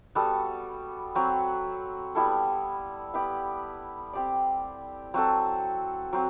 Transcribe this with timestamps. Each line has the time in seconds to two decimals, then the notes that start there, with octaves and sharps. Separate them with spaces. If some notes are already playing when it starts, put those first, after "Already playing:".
0.15 G3 B3 F#4 A4
1.15 F#3 C4 F#4 B4
2.15 G3 B3 E4 A4
3.14 B3 E4 G4 B4
4.13 C4 G4 D5
5.14 F#3 C4 F#4 A4
6.13 F#3 C4